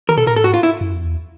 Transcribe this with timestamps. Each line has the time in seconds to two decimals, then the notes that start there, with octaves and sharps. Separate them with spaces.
0.09 D#3 A#4
0.17 B2 A4
0.27 A#2 A#4
0.35 A2 A4
0.44 G#2 F#4
0.54 F4
0.63 E4
0.81 F#2
0.93 F2
1.04 E2